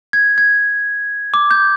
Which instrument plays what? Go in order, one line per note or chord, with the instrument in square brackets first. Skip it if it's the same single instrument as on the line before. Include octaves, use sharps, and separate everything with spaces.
[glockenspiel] G#6
G#6
D6
G6